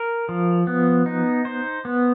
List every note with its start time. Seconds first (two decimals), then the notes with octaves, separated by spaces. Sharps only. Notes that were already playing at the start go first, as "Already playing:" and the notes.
Already playing: A#4
0.29 F3
0.67 B3
1.06 D#4
1.45 C5
1.85 B3